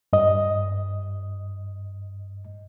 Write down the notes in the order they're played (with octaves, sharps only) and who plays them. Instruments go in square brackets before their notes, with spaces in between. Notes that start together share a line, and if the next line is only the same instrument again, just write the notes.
[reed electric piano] G2 D#5